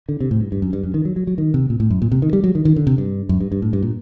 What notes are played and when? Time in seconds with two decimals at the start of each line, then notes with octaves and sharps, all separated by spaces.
0.09 D3
0.20 C3
0.31 A2
0.41 G2
0.52 G2
0.62 F#2
0.73 G2
0.83 F#2
0.94 D#3
1.05 F#3
1.16 F#3
1.27 F#3
1.38 D#3
1.54 C3
1.70 A#2
1.80 A2
1.90 F#2
2.02 A#2
2.12 C3
2.22 D#3
2.33 G3
2.44 F#3
2.55 D#3
2.65 D#3
2.76 D3
2.87 C3
2.98 G2
3.29 F#2
3.40 G2
3.52 G2
3.62 A2
3.73 G2
3.83 A#2